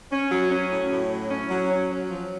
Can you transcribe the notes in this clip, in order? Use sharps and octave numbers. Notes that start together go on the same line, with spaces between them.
C#4
F#3
C#4
A2
A2
F#3
C#4
F#3
C#4
F#3
F3